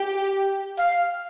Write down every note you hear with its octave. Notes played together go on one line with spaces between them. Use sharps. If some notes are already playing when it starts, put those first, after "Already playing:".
Already playing: G4
F5